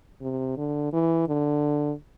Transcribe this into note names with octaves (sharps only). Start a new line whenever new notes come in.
C3
D3
E3
D3